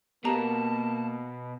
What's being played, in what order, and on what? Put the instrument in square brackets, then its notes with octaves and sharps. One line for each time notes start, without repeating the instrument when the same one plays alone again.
[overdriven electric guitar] B2 [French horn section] A#3 [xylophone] G4 A#5 [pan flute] A5